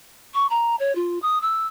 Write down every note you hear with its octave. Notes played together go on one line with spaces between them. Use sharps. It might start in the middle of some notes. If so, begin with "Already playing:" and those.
C#6
A#5
C#5
F4
D#6
E6